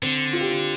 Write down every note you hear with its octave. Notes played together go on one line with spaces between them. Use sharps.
D3 C4
F4
G4
F4